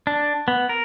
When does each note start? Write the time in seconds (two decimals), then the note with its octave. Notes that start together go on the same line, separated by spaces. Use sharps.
0.07 D4
0.48 B3
0.69 A#4